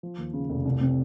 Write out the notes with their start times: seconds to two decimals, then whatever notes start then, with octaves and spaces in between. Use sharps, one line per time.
0.03 F3
0.18 D#2
0.34 C#3
0.49 F1
0.65 C2
0.81 C3